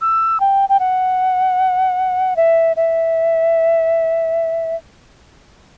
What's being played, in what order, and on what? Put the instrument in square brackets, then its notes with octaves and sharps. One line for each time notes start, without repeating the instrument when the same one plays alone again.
[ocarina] E6
G5
G5
F#5
E5
E5